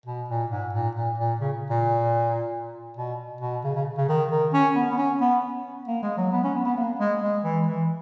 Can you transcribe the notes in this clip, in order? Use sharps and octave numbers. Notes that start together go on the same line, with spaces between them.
B2
A#2
G#2
A#2
A#2
A#2
C#3
A#2
B2
B2
C#3
C#3
C#3
D#3
D#3
C#4
B3
B3
C#4
B3
A#3
G#3
F#3
B3
C#4
B3
B3
A#3
G#3
G#3
E3
E3